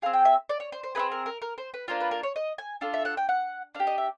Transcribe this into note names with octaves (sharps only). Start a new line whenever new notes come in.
C4 F4 G#4 F5
G5
E5
D5
C#5
C5
C5
C4 D#4 G#4 B4
A#4
A#4
A#4
C5
B4
A#3 D4 F4 C5
B4
A#4
C#5
D#5
G#5
D4 F4 A4
E5
F#5
G5
F#5
D4 F5
G4
D#5
E5